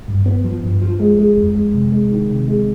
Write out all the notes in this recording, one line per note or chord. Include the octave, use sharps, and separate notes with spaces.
G2
B3
F3
G2
F3
G#3
G#3
F2
G#3
C3
G#3
D#3
C3
G#3